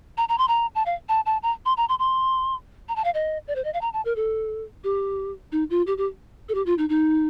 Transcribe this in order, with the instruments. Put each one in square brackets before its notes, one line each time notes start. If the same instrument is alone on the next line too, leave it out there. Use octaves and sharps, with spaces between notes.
[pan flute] A#5
A#5
C6
A#5
A5
F5
A5
A5
A#5
C6
A#5
C6
C6
A#5
A5
F5
D#5
D5
C5
D#5
F5
A#5
A5
A#4
A4
G4
D#4
F4
G4
G4
A4
G4
F4
D#4
D#4